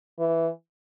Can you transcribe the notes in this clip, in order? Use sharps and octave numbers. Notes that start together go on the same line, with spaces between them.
E3